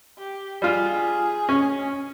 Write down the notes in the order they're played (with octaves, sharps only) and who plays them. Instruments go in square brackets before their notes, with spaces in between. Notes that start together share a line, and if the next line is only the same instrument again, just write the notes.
[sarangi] G4
[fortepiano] G3 F4 [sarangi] G#4
[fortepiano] C#4